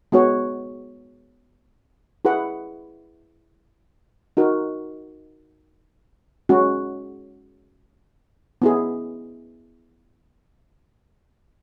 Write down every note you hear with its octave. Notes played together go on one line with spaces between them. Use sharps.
G#3 B3 F#4 C#5
E4 G#4 B4 F#5
D#4 F#4 A#4
G#3 C#4 F#4
B3 E4 G#4